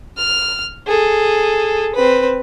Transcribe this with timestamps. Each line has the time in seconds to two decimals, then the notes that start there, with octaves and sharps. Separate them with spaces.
0.17 F6
0.87 G#4 A4
1.95 C4 B4